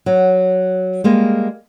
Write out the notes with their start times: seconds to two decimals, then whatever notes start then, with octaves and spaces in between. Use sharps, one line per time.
0.06 F#3
1.04 G3 G#3 A#3